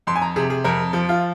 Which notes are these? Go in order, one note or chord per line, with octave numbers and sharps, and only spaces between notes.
F2 C6
G#5
A#5
C3 G#4
G#4
F2 A#4
F3
F4